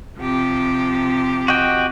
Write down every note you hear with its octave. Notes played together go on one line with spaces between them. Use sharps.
C3 F3 G4
F#4 D#5 G5